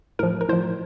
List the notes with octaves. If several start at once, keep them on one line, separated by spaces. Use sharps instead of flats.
A2 F3 A#4
A#4
A2 F3 C5